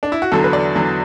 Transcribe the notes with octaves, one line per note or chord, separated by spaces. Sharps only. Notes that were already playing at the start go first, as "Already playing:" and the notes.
D4
E4
F#4
E2 D3 F#3 A4
B4
D5
E2 D3 F#3